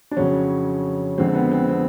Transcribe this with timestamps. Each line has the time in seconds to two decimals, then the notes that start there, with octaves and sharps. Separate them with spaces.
0.11 D4
0.17 F2 C#3 F#3 C#4
1.18 F2 D3 F3 G#3 C4
1.35 B3
1.52 C4
1.69 C4